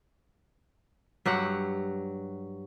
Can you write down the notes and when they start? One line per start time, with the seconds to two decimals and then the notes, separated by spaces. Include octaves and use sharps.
1.25 G2 F#3 G4 F#5